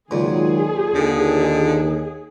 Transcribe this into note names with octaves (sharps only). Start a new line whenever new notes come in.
C#2 A#2 D#3 F#3 G#3 G#4
D#2 D3